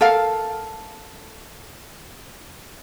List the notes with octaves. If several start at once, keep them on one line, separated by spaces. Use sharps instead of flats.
A4 A#4 F5